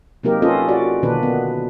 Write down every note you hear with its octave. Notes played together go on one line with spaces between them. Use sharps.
C3 F#3 A#3 D#4 G4 A#4
C#4 F4 A4 B4 D#5
F#4 D5
B2 D3 D#3 A#3 D4 B4
B3